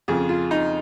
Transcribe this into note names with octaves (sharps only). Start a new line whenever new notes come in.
F2 C#3 F3 G#4
F4
D#4